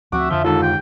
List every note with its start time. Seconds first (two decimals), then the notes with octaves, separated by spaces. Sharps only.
0.12 D2 F3 C4 F#4 E5 D6
0.31 F2 D3 F3 G7
0.44 D#2 G#2 F4 A4
0.63 G5